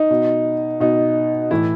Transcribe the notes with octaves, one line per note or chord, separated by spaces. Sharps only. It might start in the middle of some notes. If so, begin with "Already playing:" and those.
Already playing: D#4
B2
B2 D#4
A2 E3 E4